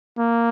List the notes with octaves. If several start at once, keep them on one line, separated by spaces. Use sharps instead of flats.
A#3